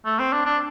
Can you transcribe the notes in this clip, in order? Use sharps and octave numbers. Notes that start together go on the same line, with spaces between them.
A3
C4
D4
D4